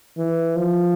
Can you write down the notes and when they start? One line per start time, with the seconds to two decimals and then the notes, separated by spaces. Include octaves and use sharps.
0.18 E3
0.56 F3